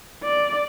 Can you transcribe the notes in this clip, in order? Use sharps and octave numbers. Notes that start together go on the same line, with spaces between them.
D5